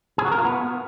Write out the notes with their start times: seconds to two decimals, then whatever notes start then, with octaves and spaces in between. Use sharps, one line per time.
0.18 G#4
0.25 F#4
0.32 A#4
0.38 F4
0.45 B3